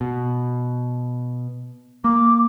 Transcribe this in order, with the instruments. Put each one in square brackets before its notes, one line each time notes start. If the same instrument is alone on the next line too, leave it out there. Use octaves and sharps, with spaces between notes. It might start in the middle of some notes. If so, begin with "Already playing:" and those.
[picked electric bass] B2
[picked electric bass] A#3 [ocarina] D6